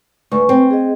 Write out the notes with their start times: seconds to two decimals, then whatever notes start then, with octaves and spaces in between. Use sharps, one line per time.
0.32 D2 B4 G#5 C#6
0.49 C4
0.71 G#4 D#5